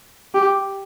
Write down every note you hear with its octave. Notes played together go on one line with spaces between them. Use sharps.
G4